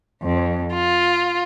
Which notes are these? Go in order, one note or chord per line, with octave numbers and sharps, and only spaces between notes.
F2
F4